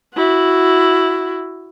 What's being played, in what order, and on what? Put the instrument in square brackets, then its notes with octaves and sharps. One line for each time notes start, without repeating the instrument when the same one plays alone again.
[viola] E4 F#4